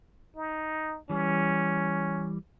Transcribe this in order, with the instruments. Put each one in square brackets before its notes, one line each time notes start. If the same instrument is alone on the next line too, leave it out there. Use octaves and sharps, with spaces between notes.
[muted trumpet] D#4
[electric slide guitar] E3 G3 [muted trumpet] C#4